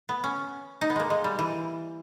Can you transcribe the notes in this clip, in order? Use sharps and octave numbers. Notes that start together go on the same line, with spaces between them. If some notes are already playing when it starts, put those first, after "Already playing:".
B3
C#4
D#4
B3
G#3 A#3
G#3
G3
E3